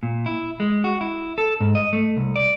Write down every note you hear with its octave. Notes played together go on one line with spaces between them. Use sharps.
A#2
E4
G#3
F#4
E4
A4
G#2
D#5
A3
C2
D5